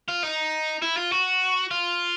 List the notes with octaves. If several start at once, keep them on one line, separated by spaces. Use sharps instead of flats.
F4
D#4
E4
F4
F#4
F4